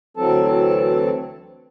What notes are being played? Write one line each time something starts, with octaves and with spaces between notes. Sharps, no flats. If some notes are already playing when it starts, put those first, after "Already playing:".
D2 E3 F#3 C4 A4 A5